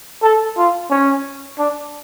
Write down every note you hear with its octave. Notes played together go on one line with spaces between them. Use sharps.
A4
F4
C#4
D4